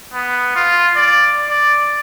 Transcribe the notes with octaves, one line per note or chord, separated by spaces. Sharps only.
B3
F4
D5
D5